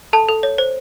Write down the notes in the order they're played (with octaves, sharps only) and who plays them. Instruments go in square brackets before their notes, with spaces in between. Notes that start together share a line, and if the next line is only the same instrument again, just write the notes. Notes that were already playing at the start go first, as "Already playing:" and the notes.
[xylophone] A4 A5
A4
C#5
C5